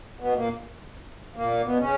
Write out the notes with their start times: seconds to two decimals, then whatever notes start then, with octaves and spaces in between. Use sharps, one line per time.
0.20 B2 B3
0.35 A#2 A#3
1.36 A#2 A#3
1.65 B2 B3
1.79 C#3 C#4